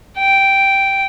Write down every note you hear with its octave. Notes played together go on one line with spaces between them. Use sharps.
G5